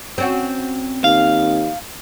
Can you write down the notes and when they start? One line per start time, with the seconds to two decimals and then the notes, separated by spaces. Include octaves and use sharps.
0.18 C4 C#4 F#4
1.04 D#2 F5